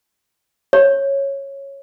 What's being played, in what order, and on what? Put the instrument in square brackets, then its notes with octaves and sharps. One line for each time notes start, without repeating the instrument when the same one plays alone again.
[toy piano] C#5